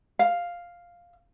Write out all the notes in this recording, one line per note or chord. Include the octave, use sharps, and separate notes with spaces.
F5